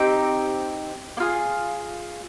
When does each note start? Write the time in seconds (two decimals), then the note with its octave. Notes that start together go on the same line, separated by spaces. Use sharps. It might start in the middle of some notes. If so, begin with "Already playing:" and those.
Already playing: C4 D#4 G4 G5
1.17 A#3
1.20 F4 G#4